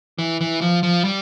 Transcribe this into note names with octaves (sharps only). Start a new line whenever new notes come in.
E3
E3
F3
F3
G3